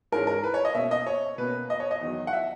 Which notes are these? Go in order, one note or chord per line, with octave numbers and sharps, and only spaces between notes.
G#2 E3 G#3 C#4 A#4
A#4
B4
C#5
D#5
B2 A#3 C#4 E5
D#5
C#5
B2 A#3 C#4 B4
D#5
C#5
D#5
E2 D#3 F#3
F#5
E5